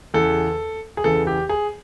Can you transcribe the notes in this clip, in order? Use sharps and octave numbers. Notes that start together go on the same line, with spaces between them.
E2 C#3 E3 A4
G#4
E2 C#3 E3 A4
G4
G#4